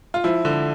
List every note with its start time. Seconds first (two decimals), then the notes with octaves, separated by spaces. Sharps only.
0.14 F4
0.24 F3 E4
0.45 D3